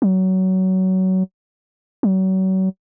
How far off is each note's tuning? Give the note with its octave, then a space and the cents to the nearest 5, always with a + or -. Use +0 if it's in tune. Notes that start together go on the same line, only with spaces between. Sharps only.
F#3 +20
F#3 +35